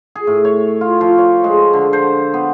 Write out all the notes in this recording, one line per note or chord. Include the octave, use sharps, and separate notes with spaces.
G#4
A2
C#5
F4
F3
C#5
G#3
D3
C5
B3